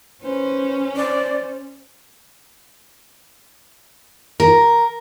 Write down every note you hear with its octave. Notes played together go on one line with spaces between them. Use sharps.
C#4 B4 C5
C5 D5
A#4